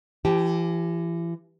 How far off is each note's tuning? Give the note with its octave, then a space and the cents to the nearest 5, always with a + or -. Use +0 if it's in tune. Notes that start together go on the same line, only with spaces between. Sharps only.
E3 +35 G4 -5 A5 -35